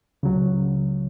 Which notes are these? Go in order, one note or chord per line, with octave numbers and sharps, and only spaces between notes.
C#2 C#3 F#3